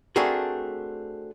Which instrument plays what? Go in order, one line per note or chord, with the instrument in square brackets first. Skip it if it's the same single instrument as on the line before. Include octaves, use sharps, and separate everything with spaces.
[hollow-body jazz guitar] A3 C4 D4 F#4 G#4 A#4